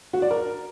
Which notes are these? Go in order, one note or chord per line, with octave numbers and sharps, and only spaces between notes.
F#4
D5
A#4